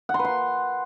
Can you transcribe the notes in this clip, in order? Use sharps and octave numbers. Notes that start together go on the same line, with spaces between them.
F#5
C6
B4
C6